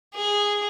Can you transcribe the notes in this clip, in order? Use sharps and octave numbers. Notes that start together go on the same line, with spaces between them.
G#4